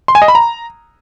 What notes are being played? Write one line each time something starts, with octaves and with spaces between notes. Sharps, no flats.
C6
G#5
D#5
B5
A#5